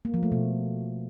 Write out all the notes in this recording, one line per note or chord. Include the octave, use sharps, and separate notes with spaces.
A#3
F3
A3
B2